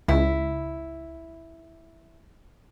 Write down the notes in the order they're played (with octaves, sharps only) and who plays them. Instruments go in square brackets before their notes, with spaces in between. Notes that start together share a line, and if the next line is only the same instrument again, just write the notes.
[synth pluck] C#2 [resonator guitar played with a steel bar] E4